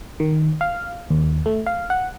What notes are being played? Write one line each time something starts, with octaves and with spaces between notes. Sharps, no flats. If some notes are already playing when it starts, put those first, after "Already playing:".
D#3
F5
D#2
A3
F5
F#5